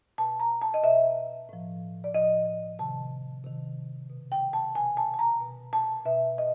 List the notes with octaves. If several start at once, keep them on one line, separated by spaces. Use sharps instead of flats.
B2 A5
A#5
A5
D#5
B2 E5
A2 F3
D5
A2 F3 D#5
C3 D#3 A5
C3 D#3
B2
G5
A5
B2 G#5
A5
A5
A#5
B2
A5
B2 E5
D#5